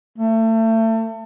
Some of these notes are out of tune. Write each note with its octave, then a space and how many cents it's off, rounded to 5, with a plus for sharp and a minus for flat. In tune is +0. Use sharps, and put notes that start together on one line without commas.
A3 +30